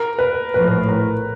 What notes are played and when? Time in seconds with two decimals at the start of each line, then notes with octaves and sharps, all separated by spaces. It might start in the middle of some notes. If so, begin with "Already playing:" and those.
Already playing: A#4
0.19 B4
0.54 A#1 A2 F3 B4
0.89 A#4